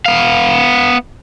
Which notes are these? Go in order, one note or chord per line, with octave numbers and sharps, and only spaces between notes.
B3 F5